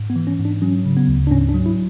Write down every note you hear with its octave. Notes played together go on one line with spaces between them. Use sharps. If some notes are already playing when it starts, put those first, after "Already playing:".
Already playing: G#2
B3
E3
C#4
G#2
D4
F#3 C#4
C#3
B3
D2
D4
G#2 C#4
D4
F#3
E4